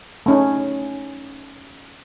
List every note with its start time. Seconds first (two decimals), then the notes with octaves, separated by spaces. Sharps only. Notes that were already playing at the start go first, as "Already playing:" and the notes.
0.26 A3 C#4 D#4